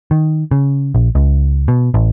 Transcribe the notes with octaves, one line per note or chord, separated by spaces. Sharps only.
D#3
C#3
A#1
C#2
B2
A1